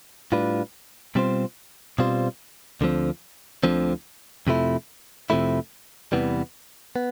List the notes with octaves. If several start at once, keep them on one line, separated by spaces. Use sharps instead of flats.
A2 G3 D4 F4 B4
B2 G3 C4 F4 C5
B2 G3 C4 F4 C5
D2 D3 F3 C4
D2 D3 F3 C4
F2 C3 F3 A3 E4
F2 C3 F3 A3 E4
E2 C3 E3 G3 B3
B3